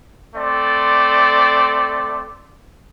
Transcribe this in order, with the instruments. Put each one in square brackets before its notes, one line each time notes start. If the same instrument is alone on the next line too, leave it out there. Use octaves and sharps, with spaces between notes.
[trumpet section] A3 C4 D5